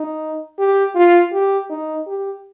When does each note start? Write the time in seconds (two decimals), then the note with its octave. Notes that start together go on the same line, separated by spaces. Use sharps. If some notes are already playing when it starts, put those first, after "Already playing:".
Already playing: D#4
0.59 G4
0.95 F4
1.33 G4
1.70 D#4
2.07 G4